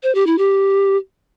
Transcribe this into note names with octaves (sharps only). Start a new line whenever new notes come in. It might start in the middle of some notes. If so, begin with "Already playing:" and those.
C5
G4
E4
G4